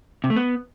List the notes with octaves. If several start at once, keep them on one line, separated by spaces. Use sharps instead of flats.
C3
A3
B3